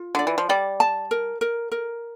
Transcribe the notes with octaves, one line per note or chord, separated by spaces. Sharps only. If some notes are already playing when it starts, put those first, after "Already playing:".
Already playing: F4
D3 D5
E3
F3
G3 D5
A5
A#4
A#4
A#4